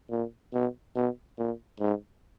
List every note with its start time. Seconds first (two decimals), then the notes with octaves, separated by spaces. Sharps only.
0.10 A#2
0.53 B2
0.95 B2
1.38 A#2
1.80 G#2